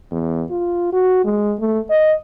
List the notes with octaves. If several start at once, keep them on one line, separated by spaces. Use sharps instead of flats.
E2
F4
F#4
G#3
A3
D#5